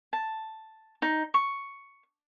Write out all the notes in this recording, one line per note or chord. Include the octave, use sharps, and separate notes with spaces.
A5
D#4
C#6